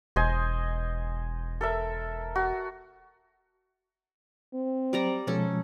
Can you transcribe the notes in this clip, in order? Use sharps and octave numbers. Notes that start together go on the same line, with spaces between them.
E1 C5 D#5 G#5
A4 A#4 E5
F#4
C4
F#3 G3 D5 A#5
B2 F3 G#3 C#4 A4